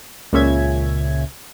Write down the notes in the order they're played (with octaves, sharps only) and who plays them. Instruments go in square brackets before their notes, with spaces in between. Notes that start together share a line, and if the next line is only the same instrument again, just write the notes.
[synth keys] C#2 A#2 C#3 C#4 E5 G#6